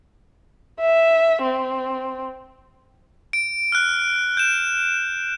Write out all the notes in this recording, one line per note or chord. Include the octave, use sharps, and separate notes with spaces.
E5
C4
D7
F6 F#6
G6 E7